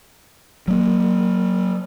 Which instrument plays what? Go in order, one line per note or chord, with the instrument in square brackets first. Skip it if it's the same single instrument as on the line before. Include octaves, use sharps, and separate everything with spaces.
[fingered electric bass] F#3 A#3